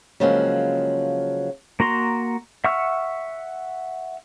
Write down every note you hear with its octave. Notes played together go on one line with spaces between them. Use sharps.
C#3 F3 F#3 G#3 A#3 C4
A#3 F#4 A#5 C6
E5 F#5 C#6 E6 F6